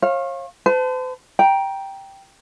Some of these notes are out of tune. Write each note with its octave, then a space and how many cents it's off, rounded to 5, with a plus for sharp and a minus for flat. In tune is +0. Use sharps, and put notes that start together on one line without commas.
C#5 -40 F5 +0
C5 -45 A5 +0
G5 +0 A#5 +20